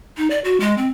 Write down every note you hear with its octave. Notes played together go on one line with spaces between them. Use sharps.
D#4
D5
F#4
G#3
C4